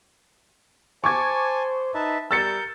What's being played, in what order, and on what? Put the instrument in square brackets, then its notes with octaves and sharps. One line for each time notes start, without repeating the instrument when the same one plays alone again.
[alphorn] C5 [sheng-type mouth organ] G#5 A5 [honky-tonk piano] C#6 D6 G#6
[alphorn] D#4 [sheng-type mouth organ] B4 E5 A5
[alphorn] G3 [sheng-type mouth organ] A#4 G6 [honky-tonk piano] E6 A6 C#7